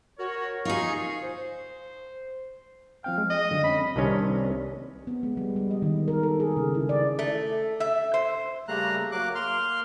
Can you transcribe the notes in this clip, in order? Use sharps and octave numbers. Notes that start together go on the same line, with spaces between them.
F#4 A#4 C#5
D#4 F4 G#4 C#6
C5
F3 C4 F5 G5
G#3
D#5
F#2 D3
C4 C#4 B5
C2 C3 D#3 C#4 D4
B3
G#3
G3
G3
D#5
D#3
A#4
A4
G#4
C#3
E4
D5
A3
E5
C5
C#3 G3 A3 A#3 A#5 F#6
F#3 A#3 D6 F#6
A#3 C6 F6